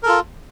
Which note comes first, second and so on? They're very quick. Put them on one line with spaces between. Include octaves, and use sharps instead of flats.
A#4 A4 F4